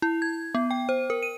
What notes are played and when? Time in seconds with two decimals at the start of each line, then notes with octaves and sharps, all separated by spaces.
0.02 E4
0.22 G#6
0.55 B3
0.71 G5
0.89 C5
1.10 A#4
1.23 D#7